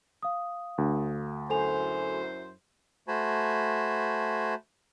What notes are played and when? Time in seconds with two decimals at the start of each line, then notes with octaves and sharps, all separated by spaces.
0.23 F5 D#6
0.78 D2
1.50 F#2 E4 A4 C5 G#5 F7
3.08 A3 F#4 C5 G#5 A5 B5